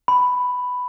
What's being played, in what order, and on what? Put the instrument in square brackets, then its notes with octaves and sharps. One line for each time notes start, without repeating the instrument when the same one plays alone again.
[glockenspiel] B5